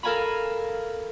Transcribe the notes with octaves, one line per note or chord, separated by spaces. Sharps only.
A4 A#4 F5 G#5 A#5 B5